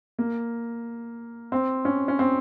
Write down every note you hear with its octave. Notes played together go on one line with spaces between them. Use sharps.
A#3
C4
C#4
C#4
C4